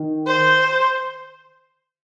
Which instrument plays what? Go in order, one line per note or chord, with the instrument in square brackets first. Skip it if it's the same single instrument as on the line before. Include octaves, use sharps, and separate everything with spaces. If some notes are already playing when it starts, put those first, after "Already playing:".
Already playing: [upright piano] D#3
[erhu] C5